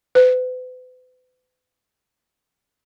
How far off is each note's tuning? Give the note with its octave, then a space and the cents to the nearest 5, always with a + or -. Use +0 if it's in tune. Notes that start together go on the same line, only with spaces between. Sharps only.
B4 +40